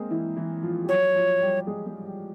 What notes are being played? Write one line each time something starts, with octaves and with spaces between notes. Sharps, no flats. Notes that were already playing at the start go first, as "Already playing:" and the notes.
Already playing: G#3 A#3 C4 G#4
E3 E4
E3 E4
F3 F4
G4
F#3 F#4 C#5
F3 F4
G3 G4
G#3 G#4
G#3 G#4
G3 G4